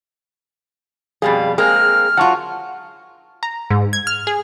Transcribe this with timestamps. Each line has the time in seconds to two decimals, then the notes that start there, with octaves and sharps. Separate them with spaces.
1.22 F2 B2 G3 G#4 F5 B5
1.58 G#3 A#3 C4 G#4 F6
2.17 F#3 F4 F#5 A5 C#6
3.43 A#5
3.70 G#2
3.93 G#6
4.07 F6
4.27 G#4